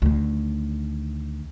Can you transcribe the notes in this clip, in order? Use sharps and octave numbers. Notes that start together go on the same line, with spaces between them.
D2 D#3